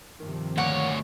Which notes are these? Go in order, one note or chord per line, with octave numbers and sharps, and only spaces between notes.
G2 C3 D#3 F3
D2 A#2 C#5 F#5